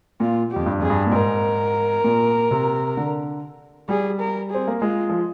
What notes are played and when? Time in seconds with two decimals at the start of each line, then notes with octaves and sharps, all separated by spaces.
0.20 A#2 F4
0.51 G4
0.56 F2
0.66 G2
0.79 F2 G#4
0.90 G2
1.07 A#2
1.12 G#2 A#4
2.04 A#2
2.51 C3
2.97 D3
3.89 G3 G#4
4.20 A#4
4.50 C4 G#4
4.68 A#3
4.80 G#3 F4
5.09 F3